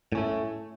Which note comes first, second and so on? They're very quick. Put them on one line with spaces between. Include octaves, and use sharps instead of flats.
A2 C#4 A3